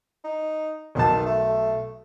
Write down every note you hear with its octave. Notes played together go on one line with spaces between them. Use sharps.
D#4
B1 D#3 A5
A3